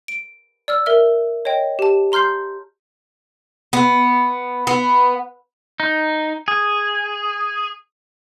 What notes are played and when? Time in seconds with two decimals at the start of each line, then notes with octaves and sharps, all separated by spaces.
0.08 D7
0.68 D5 E6 F6
0.86 A#4 E5 F6
1.45 C#5 D#5 G5
1.79 G4 A5
2.12 A#5 C6 F6 G6 C7
3.73 B3
4.67 B3
5.80 D#4
6.48 G#4